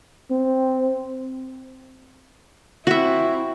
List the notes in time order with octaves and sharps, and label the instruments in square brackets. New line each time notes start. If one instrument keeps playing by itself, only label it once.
[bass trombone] C4
[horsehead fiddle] C4 E4 [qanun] F#4 E5